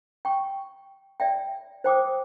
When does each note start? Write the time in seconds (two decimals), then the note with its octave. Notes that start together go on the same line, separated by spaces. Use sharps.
0.25 G5 C#6
1.20 D5 E5 G5
1.84 C5 G5 D6 D#6